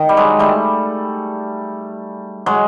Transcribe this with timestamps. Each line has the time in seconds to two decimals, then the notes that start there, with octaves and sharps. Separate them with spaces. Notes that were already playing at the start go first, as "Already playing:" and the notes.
Already playing: D#3
0.09 G3
0.17 F#3 G#3
0.39 G3 A3
2.46 F#3 G#3